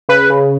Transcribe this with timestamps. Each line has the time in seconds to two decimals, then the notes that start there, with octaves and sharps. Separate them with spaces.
0.09 C#3 B4
0.30 C#3